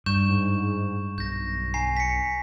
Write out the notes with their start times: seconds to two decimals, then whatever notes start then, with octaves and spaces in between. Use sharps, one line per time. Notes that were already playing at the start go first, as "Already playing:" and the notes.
0.06 G2 C#6 G6 E7
0.29 G#2
1.18 B1 G6 A#6
1.74 G#5 A#5 C7
1.97 B6 C#7